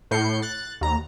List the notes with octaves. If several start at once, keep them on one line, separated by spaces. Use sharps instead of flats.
A2 G6 C7 C#7
F#6 A6
D#2 A#5